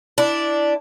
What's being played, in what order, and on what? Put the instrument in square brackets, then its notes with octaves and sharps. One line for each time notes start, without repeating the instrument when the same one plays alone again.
[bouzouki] D4 E4